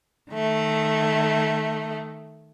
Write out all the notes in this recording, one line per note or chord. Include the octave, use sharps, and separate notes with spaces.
D#3 A3